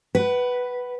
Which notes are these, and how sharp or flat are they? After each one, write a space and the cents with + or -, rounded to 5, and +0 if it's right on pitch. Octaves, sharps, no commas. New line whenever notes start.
B4 +0 F#5 +30